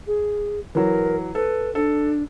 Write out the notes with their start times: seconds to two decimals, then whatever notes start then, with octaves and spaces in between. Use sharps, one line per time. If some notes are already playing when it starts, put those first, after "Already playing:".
0.07 G#4
0.75 E3 F#3 A#4
1.35 A4 B4
1.75 D4 A4